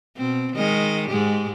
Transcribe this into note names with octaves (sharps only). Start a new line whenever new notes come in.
B2 C4
D#3 G#3 D#5
G#2 G#3 G4